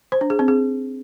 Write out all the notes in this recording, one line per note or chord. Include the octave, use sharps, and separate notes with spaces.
C5
D4
G#4
C4
G#4